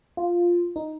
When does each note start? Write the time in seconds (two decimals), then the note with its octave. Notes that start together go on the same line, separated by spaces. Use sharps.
0.17 F4
0.76 D#4